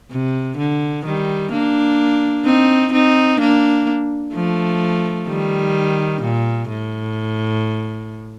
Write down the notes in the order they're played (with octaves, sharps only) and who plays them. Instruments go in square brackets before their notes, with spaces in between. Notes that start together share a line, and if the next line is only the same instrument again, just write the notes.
[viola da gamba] C3
D3
D#3 G3
A#3 D4
C4 D#4
C4 D#4
A#3 D4
F3 A3
D#3 G3
A#2
A2